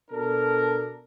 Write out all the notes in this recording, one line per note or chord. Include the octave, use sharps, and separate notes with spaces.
B2 D4 A4 A#4